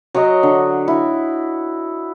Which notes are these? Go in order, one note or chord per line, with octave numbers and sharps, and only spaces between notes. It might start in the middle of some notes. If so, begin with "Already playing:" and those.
F#3 F#4 C#5 D#5
D3
E4